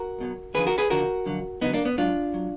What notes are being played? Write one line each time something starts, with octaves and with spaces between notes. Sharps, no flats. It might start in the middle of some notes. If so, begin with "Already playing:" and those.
Already playing: F#4 A#4
B1 B2 F#3
D#2 D3 F3 G#4 B4
F#4 A#4
G#4 B4
D#2 D3 F3 F#4 A#4
F2 D3 F#3
F2 D3 F#3 B3 D#4
A#3 D4
B3
G#2 F#3 D4 F4
F#3